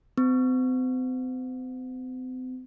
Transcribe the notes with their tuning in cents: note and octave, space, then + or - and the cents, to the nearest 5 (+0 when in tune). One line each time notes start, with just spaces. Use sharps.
C4 -40